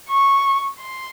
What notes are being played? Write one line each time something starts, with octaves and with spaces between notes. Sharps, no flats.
C#6
C6